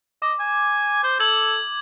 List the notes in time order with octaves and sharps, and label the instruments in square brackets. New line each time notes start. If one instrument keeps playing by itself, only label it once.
[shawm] D#5 [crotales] D6
[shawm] G#5
C5
[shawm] A4 [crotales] G#6 F#7